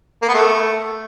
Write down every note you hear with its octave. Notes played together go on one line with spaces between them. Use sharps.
A#3
B3
A3